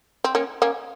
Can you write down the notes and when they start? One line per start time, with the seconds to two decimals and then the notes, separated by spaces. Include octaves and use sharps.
0.24 C4
0.35 A#3 C#4
0.62 A#3 C#4